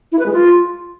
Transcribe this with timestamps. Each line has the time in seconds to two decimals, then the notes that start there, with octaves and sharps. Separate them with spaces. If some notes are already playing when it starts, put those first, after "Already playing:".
0.12 E4
0.19 B4
0.26 G#3
0.33 F4